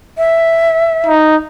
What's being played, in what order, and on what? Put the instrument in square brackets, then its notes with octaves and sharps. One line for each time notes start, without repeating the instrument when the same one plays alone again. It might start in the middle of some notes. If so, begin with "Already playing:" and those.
[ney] E5
[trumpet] D#4